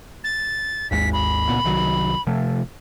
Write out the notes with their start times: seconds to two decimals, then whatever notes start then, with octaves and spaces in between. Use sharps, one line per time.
0.24 A6
0.91 G#1 D#2 G#3 B6
1.13 B5
1.49 C#2 A#2 B3
1.64 C2 D#3 F#3
2.27 C3 F3 A3